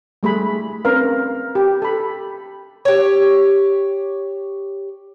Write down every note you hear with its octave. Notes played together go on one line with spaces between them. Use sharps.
G3 A3 G#4 B5
C4 C#4 A#4 B4 F5
G4
A4 B5
G4 C#5